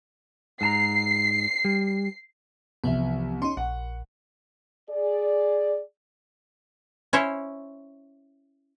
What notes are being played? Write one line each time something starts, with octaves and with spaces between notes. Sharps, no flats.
G#2 A5 A#5 C7
G3
C2 E3 F3 B3 E5
C#4 D#4 C6
A#1 F#5
G#4 D5
C#4 E4 C5 C#5